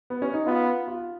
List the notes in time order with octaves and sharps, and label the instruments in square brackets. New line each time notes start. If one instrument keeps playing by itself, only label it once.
[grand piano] B3
C#4
D#4
[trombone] B3 [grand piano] F4
[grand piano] F4